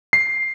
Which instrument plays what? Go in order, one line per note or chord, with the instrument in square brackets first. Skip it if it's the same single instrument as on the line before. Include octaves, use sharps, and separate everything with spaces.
[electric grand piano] C7